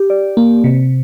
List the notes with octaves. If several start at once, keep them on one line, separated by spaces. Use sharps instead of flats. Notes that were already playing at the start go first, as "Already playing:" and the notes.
Already playing: G4
D5
A#3
C3